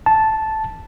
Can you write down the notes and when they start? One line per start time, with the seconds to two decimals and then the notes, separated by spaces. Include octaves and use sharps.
0.06 A5